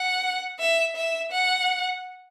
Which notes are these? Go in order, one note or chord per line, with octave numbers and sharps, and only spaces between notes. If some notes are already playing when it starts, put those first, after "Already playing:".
Already playing: F#5
E5
E5
F#5